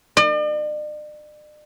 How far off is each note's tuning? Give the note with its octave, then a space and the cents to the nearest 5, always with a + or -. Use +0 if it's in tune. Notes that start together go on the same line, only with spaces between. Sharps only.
D5 +45